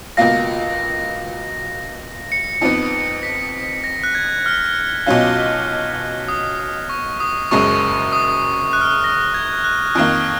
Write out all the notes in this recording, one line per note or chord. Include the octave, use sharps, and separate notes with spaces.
C#2 B2 A#3 F4 A#6
C#7
F2 F3 B3 D#4
B6
A#6
F#6
G#6
F6
B1 B2 F#3 C#4 F4
D#6
D#6
C#6
D#6
F#1 F#2 C#3 G#3 C#6
D#6
F#6
F6
F#6
A#6
G#6
F#6
F2 D#3 A#3 F6